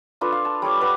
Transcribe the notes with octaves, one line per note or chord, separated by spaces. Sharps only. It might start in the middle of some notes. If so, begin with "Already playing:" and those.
D4 F4 A4 B4
F5
A5
G3 A4 C#5 D6
B4 F#5